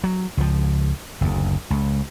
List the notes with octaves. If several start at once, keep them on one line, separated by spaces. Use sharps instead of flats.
F#3
C#2 F3
F#1 D2
C#2